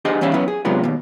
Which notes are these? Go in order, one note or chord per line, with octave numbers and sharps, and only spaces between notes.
D4 G4 G#4 C5 D#5
E3 G3 C#4 E5 F5
F#3 B3 C#4 E4
G#4
C3 F#3 G#3 B3 D4 F4
D#2 B2